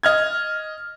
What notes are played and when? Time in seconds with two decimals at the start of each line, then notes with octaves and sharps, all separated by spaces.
0.03 D#5 F6 G#6